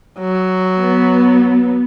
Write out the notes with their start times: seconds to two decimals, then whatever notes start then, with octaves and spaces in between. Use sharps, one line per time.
0.19 F#3
0.78 B3